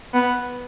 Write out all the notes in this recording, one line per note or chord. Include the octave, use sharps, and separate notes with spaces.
B3